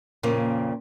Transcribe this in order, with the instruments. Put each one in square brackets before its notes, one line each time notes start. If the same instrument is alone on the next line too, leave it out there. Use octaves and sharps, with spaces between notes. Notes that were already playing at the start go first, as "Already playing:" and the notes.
[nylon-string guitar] F2 A#2 C#3 A#3 C#4